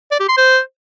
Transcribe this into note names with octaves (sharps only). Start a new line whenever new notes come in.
D5
G4
C6
C5